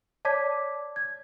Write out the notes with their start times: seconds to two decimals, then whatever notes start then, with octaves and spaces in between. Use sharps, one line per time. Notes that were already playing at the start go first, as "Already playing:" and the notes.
0.25 C#5 D5 A5 D6 G#6 B6
0.96 G#6